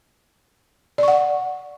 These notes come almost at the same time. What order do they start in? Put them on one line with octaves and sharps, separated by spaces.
D5 C#6 F#5